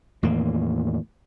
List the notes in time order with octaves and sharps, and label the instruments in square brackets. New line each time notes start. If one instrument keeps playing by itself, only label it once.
[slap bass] E2 A2 D#3 A#3